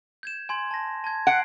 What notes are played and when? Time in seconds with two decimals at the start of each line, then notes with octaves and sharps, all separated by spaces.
0.23 G6 G#6 E7
0.49 G#5 C6 G#6
0.71 A5 A#6
1.04 A5 G#6
1.27 F#5 C7 D7